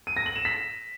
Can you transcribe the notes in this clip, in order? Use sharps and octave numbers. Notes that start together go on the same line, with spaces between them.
D#7
A#6
F#7
E7
B6